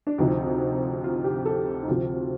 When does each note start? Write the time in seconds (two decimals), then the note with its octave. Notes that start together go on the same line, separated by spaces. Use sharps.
0.07 D4
0.18 D2 C3 F3 D#4
1.04 F4
1.24 G4
1.45 A4
1.83 D#4
1.88 D2 C3 F3 F4